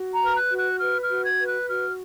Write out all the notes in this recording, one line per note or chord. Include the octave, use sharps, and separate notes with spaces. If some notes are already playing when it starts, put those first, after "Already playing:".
Already playing: F#4
A#5
B4
F6
F#6
F#4
F#6
B4 F6
F6
F#4
G#6
B4
F#6
F#4 F6